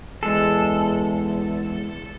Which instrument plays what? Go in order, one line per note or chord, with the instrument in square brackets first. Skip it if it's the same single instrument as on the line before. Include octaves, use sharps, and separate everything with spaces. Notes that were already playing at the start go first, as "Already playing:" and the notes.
[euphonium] E2 [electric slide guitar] G#3 G#4 [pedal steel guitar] A4